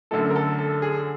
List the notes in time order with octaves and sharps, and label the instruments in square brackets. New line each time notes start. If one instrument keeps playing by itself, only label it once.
[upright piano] F#2 D3 F#3 A3 A4
A#4
A4
A4
G#4